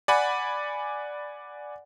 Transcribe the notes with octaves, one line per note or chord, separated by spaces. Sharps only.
D5 F#5 G#5 B5